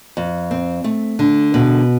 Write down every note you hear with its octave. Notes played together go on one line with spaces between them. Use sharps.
F2
C4
A3
D3
B2